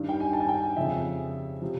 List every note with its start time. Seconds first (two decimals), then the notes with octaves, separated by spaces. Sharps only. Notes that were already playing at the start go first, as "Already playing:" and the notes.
Already playing: G2 D#3
0.09 G5
0.20 G#5
0.33 A5
0.40 G#5
0.49 G5
0.77 F2 C#3 F3 E5
1.62 C3 F3